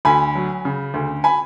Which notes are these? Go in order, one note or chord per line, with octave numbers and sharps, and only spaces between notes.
D2 G#5 B5
F#3
C#3
D2
G#5 B5